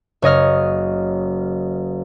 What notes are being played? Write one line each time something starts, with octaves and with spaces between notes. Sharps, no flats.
F#1 C#5 D#5 F6